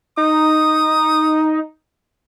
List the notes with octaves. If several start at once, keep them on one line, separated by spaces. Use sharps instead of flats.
D#4 D#6